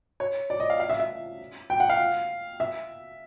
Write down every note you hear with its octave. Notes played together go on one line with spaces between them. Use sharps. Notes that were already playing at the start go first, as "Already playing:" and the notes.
C#5
D5
D#5
F5
F5
E5
E5
G5
F#5
F5
E5